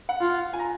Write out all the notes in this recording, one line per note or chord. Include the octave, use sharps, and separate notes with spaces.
F#5
F4
G#5
A#5